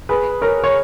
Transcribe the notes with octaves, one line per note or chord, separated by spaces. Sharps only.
G#4 B4
A#4 C#5
C#5